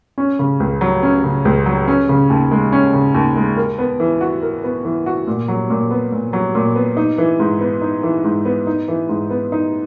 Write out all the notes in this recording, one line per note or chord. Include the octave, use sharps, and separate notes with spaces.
C#4
C#3
C#2
F#3
C#4
C#3
C#2
F#3
C#4
C#3
D#2
G#3
C#4
C#3
D#2
G#3
A#4
B3
E3
F#4
A#4
B3
E3
F#4
A#2
F#3
A#2
B3
A#2
F#3
A#2
B3
D#4
E3
G#2
B3
D#4
E3
G#2
B3
D#4
E3
G#2
B3
D#4